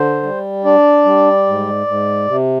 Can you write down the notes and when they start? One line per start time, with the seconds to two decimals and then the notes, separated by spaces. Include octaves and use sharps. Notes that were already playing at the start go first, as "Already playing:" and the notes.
Already playing: D3 C5
0.23 G3
0.64 D4 D5
1.05 G3
1.47 G#2
1.87 G#2
2.28 C3